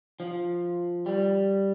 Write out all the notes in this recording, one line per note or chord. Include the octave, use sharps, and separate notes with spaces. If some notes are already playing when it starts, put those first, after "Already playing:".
F3
G3